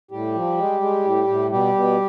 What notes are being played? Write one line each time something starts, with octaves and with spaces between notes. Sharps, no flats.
A2 G3 G4
F3
G#3
G#3
A2
A2
B2 G3 G4
B2